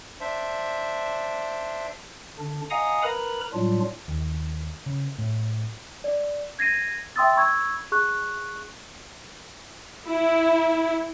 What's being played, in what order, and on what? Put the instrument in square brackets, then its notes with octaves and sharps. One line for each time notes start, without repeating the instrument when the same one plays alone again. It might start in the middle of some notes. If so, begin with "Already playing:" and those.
[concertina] D4 C5 E5
[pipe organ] D3 D4
D#5 F5 F#5 G#5 A#5 D#6
A#4 B4 A#5 B5
A2 F#3 G3 D4 F4
[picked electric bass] D#2
C#3
A2
[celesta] D5
G#6 A#6 C7 D#7
E5 G5 C6 D#6 E6 A6
B5 C#6 E6 G#6
G#4 C#6 F#6
[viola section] E4